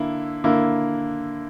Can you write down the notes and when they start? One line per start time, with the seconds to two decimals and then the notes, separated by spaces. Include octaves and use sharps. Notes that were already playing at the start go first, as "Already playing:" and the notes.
Already playing: D3 A#3 E4
0.44 D3 A#3 E4